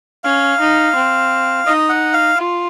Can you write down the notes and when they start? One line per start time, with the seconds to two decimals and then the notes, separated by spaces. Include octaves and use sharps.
0.24 C#4 F5
0.60 D#4
0.96 C4
1.66 D#4 D#5
1.89 F#5
2.13 F5
2.37 F4